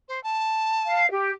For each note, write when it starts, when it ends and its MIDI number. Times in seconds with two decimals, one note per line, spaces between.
0.08 0.22 72
0.23 1.02 81
0.87 1.07 77
1.12 1.31 67